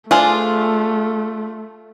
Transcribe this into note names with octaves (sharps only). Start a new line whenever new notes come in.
A3 D4 F4 G#4 C5